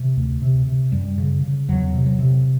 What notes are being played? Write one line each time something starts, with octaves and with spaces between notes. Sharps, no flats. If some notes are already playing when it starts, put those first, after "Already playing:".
Already playing: C3
D2
C3
C3
F#2 G3
C#3
C#3
E2 F#3
C3
F#3
C3